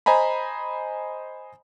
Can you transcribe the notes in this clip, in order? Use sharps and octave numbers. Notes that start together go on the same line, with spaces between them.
C5 D#5 G#5 A#5 B5